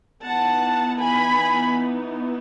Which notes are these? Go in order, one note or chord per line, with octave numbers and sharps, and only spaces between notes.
E3 B3 D#4 F#5 A5
G#5 B5